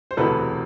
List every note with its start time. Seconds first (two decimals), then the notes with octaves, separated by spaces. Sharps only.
0.11 C5
0.17 E1 D2 C3 E3 A4 B4